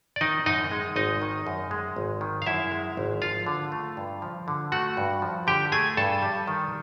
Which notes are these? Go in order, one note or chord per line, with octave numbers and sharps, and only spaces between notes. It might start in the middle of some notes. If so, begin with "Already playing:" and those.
D5
D#3 D#4 D#5
F#2 D#4 D#5
G#3
G#1 D#4 D#5
D#3
F#2
G#3
G#1
D#3
F5
F#2 E4 E5
G#3
G#1
F3 F4 F5
D3
A3
G2
F3
D3
A3 F#4 F#5
G2
F3
D3 G4 G5
A3 G#4 G#5
G2 A4 A5
G3
D#3